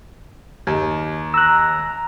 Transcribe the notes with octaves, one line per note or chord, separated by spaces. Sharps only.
D#2
A#5 E6 F#6